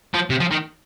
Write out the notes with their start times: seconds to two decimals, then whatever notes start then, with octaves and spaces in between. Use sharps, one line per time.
0.14 F3
0.30 C3
0.40 F3
0.51 D#3